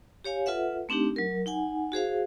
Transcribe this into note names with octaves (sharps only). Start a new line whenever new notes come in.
G4 C#5 F5 G#5
F4 A4 B4 E5 F#5
A3 C4 D4 D#4 G4
F#3 A#4
D#4 F#5 G#5
F#4 G#4 C5 F5